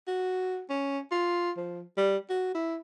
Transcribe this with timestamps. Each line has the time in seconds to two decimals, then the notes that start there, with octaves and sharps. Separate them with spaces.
0.07 F#4
0.70 C#4
1.11 F4
1.57 F3
1.97 G3
2.30 F#4
2.55 E4